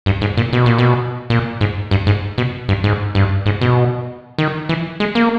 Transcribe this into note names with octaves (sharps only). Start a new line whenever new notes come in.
G2
G#2
A#2
B2
A#2
B2
A#2
G#2
G2
G#2
B2
G2
G#2
G2
G#2
B2
D#3
E3
G#3
A#3